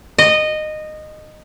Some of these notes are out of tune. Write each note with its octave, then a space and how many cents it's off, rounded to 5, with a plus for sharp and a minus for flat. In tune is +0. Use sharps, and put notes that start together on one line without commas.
D#5 -15